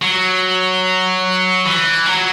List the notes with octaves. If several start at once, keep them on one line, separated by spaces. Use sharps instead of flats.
F#3
E3
F#3